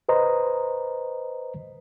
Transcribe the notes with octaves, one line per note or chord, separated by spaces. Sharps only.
B4 C5 D#5 A#5